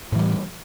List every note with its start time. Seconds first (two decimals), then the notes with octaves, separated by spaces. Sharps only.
0.12 A2
0.16 E3
0.19 G3